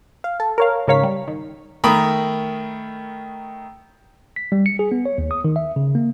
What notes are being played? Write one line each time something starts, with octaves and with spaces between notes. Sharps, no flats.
F5
A4
A#4 C#5 F5
G#2 C#3 A#4 C#5 F5 B6
G3
D#3
D#3 A3 A#4 A#5 B5 D#6
B6
G3
C#7
G#4
B3
C#5
D#2
D#6
D#3
E5
C#3
A#3